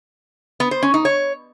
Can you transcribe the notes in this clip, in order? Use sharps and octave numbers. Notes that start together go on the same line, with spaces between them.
B3
C5
C#4
D#4
C#5